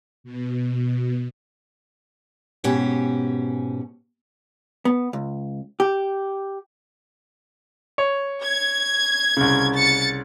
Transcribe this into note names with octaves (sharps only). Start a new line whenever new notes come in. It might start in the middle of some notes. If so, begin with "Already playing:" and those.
B2
G#2 B2 C#4 G4
B3
C#2
G4
C#5
G#6
C2 C#3
A6 C#7